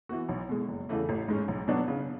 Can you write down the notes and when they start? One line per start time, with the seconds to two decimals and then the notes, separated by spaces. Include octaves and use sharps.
0.09 E3 B3 F#4
0.29 B1
0.49 B2 G#3
0.68 F#1
0.89 E2 C#3 E3 A3
1.09 A1
1.28 G#2 G#3 C#4
1.48 B1
1.68 B2 F#3 B3 D4
1.88 C#3